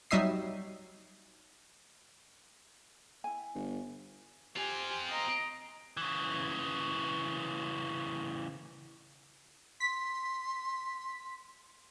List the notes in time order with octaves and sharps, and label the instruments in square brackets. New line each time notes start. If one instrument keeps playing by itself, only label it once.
[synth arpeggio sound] F#3 G3 D#4 E5 D#6 C7
[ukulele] E4 G#5
[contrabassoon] G1
[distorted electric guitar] C4 F4 [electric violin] G4 G#5
[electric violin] D#5 A#5
[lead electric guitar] C#3 E3
[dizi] C6 [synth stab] B6